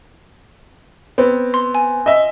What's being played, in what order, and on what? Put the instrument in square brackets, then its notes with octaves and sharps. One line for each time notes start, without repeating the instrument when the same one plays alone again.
[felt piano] B3 C4
[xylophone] C6
G#5
[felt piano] D#5 E5